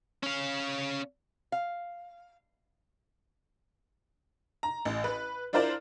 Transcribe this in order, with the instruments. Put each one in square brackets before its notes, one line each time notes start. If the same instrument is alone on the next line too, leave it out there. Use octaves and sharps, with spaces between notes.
[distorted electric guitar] C#4 F5
[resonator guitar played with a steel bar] F5
[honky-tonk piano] A#5
A1
B4
D4 E4 F4 A#4 C5 D5